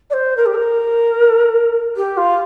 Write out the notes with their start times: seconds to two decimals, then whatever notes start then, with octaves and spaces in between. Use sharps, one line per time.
0.10 D5
0.13 C5
0.37 A#4
0.46 G4
0.55 A#4
1.96 G4
2.17 F4